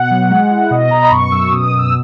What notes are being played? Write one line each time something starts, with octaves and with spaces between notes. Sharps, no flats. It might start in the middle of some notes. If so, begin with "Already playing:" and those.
Already playing: B2 F#5
F#3
G#3
E4
B2 D#5
B2 A#5
B5
F#2 C#6
F#2 E6
E6
B2 D#6
B2
E6